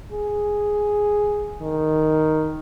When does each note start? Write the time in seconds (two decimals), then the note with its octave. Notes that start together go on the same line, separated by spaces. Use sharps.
0.12 G#4
1.62 D#3